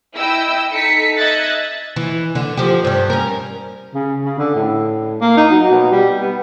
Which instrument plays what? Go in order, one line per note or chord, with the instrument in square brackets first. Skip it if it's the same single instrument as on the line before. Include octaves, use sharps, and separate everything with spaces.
[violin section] E4 D#5 G5 E6
D#4 A4 B6 C#7
D#5 E5 F#6 G#6 A6
[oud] E3
D3
F3 G4
G2 G3
C#4 A#4
[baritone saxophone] C#3
C#3
D3
A2
A#3
D#4
F#3
B2
G3
B3